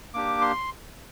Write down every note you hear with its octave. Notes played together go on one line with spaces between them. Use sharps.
A#3 D4 G4 D6
C6